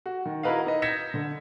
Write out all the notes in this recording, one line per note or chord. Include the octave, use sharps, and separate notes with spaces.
F#4
D#3
E4 F#4 A#4 B4 D#5 F5
D#4 B4 D#5
G6 G#6 A#6 B6 C#7 E7
D3